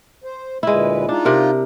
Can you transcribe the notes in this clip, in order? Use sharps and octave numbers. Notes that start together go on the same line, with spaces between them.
C5
D2 A#2 G#3 E4 B4
D4 D#4 F4
C3 A#4